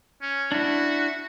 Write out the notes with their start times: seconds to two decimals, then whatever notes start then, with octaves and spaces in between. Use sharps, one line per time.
0.22 C#4
0.52 D4 E4 F#4